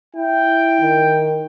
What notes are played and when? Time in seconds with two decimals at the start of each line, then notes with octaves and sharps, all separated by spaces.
0.15 E4 G5
0.81 D#3